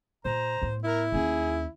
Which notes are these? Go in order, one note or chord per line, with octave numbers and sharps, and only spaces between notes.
A#2 C5 A#5
A2 B3
E4 A#4
D#2 C#4 G#4